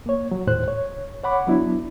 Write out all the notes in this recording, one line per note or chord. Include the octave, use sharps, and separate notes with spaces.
A#3 C#5
F#3
D#2 A2 C5 F#6
C#5
C#5 F#5 B5 D6
F#3 B3 D4 E4